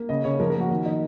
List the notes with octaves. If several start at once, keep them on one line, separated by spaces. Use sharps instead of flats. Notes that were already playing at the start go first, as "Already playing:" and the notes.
Already playing: A#3
C#3 D#5
C#3 C#5
F3 A#4
A#4
A#3 F#4
D#3
D#4